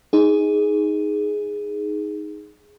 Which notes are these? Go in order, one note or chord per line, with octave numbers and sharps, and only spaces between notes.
D#4 G#4